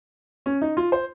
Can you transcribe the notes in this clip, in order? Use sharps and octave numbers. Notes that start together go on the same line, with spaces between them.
C#4
D#4
F4
C5